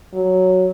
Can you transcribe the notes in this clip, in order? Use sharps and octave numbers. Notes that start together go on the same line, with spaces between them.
F#3